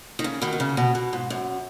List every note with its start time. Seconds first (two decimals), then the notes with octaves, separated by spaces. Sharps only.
0.19 D#3
0.24 C#3
0.42 B2 D#3
0.53 B2
0.60 C#3
0.77 B2
0.95 B2
1.13 G#2
1.30 F#2